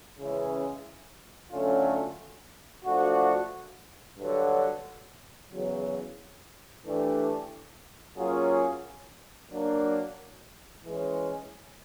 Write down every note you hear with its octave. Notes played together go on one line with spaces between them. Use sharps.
C#3 E3 G#3 C#4 E4
D3 F#3 A3 C#4 F4
F3 A3 D4 F#4
G2 D3 F#3
E2 C#3 F#3
E3 A3 D4 G4
F#3 A#3 C#4 F4 G#4
F#3 A#3 D4
E3 G#3 C#4